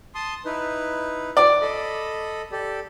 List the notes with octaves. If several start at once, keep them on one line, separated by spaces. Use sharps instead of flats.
A5 C6 D#6
D#4 E4 B4
D5
A4 D#5 B5
G4 A4 D5